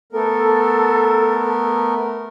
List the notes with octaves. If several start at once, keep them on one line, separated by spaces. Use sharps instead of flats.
A3 B3 A4 A#4